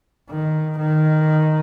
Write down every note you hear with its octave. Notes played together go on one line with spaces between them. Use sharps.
D#3
D#3